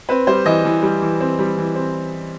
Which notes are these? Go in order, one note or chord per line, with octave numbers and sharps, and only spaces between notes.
C4 B4
G3 C5
E3 D#5
E3
G3
E3
C4
G3
E3
C4